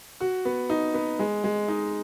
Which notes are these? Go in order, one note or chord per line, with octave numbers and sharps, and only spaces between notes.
F#4
B3
D#4
B3
G#3
G#3
D#4